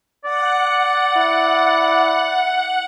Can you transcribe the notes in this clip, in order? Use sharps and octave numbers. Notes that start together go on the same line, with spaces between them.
D5 F#5
E4